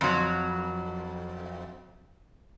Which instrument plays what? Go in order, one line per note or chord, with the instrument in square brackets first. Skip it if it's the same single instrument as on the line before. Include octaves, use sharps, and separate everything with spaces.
[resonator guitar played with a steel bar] F2 F#3